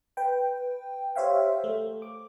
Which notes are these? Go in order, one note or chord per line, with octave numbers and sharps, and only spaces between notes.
B4 G5
G4 C5 C#5 E5 F5 G5
A3
D6